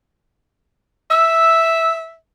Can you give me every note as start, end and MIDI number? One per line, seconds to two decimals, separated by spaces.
1.10 2.15 76
1.10 1.93 88